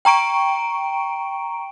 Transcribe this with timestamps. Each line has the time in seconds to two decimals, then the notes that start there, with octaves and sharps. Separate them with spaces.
0.05 G5 A#5 C#6 D7